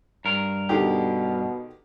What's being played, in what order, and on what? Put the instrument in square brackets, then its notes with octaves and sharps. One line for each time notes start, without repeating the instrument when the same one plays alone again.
[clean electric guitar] G2 A#4
[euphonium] B2 [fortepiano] D3 D#3 G4